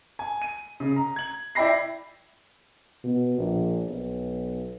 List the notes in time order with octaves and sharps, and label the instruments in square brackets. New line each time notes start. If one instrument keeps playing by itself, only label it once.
[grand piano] G#5
D#7
C#3
A#5
G#6 F#7
E4 D5 G5 B5 A#6 C7
[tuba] B2
A#1
B1